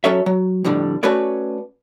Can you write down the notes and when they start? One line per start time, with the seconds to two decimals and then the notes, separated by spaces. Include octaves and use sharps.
0.04 F#3 C#4 A4 C#5 E5
0.26 F#3
0.64 F2 A2 D3 G3
1.03 A3 C#4 F#4 B4 C#5 D5